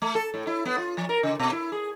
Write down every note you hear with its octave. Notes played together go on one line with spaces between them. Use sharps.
A3
A4
A2
E4
B3
F4
F3
A#4
C#3
B2
E4
G#4